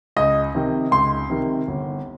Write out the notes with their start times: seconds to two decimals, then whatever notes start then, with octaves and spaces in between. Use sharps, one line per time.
0.16 C#2 D#5
0.55 C3 D#3
0.91 C#2 C6
1.30 C3 D#3
1.68 G1